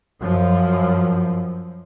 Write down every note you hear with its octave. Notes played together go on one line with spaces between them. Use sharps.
F#2 F3